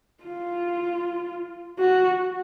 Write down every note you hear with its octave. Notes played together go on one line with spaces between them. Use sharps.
F4
F#4